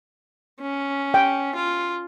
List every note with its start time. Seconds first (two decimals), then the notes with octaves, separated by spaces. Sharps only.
0.61 C#4
1.14 G5
1.55 F4